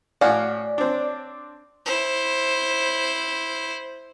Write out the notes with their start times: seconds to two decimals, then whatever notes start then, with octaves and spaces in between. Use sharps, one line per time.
0.21 A2 C#4 F#4 D5 F5
0.78 C4 D4
1.86 E4 C5